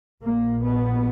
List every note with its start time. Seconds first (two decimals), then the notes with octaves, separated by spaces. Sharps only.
0.22 A#1 A#2 A#3
0.63 B3